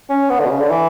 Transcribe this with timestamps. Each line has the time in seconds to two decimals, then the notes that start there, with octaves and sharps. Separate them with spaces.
0.09 C#4
0.30 B3
0.40 D3
0.45 B2
0.50 C#3
0.60 D3
0.70 E3